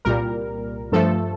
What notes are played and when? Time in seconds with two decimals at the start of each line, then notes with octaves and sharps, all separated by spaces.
0.05 C2 A#2 G3 A#4
0.92 G2 F3 A3 A4